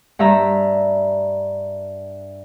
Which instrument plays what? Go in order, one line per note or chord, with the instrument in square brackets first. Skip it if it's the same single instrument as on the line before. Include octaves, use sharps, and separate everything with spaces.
[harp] G2 G3 E5 A#5